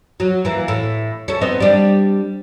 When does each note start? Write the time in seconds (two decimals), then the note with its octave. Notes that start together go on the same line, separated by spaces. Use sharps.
0.20 F#3
0.45 E3 A#3
0.68 A2
1.28 C#4 A4
1.41 B3 C4 D#4
1.60 G3 D4